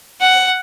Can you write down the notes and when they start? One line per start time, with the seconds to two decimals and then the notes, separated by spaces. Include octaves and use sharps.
0.21 F#5